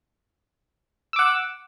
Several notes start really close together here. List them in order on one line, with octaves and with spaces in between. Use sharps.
E6 D6 F#5